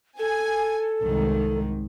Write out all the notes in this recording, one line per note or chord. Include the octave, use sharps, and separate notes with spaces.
A4 G#5
C2 G#2 D#3